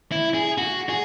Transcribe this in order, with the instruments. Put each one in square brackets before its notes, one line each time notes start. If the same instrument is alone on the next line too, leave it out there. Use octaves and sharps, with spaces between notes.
[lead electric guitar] E4
G#4
F#4
G#4